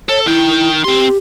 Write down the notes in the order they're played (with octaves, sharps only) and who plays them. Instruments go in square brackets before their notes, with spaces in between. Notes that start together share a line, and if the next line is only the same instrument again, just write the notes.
[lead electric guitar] A4 [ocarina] C#5
[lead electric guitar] D#3 G5 [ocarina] E4
[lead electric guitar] C4 C6 [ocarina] G4